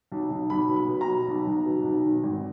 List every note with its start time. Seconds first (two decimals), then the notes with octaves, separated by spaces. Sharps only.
0.12 B1
0.31 B1
0.50 B1 B5
0.69 B2
0.76 B5
0.88 B2
1.01 A#5
1.08 F#3
1.28 B1
1.47 B1
1.66 B2
1.84 B1
2.04 D#3
2.23 G#1